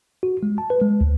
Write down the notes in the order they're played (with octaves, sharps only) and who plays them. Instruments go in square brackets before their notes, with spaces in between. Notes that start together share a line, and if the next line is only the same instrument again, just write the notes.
[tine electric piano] F#4
G#3
A5
B4
G#3
D2